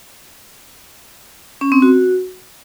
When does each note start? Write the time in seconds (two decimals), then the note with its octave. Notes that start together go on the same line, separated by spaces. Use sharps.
1.61 C#4
1.72 C4
1.82 F#4